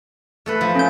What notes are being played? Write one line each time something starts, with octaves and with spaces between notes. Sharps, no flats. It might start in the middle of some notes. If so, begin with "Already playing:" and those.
A3 A4 B4
F3
C#4 G6